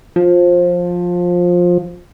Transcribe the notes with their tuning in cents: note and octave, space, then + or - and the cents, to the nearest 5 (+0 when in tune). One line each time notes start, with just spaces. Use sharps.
F3 +15